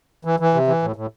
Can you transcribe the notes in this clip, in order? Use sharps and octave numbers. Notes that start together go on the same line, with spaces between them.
E3
E3
C3
E3
A2
A2